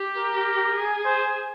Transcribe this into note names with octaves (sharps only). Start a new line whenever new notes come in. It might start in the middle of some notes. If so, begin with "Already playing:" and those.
Already playing: G4
A#4
G#4
C5